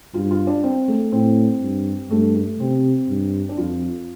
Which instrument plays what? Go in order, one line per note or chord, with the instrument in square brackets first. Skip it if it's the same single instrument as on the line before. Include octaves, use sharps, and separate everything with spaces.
[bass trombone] G2 [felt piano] F4
[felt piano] F4
D4
C4
A3
[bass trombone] A2 [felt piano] C4
[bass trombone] G2
[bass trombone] G2 [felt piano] A3
[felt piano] A3
[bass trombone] C3 [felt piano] C4
[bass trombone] G2
[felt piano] D4
[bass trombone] F2 [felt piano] F4